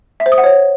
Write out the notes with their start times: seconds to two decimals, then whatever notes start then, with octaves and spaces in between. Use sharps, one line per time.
0.20 E5
0.26 C5
0.32 D#6
0.38 F#5
0.44 C#5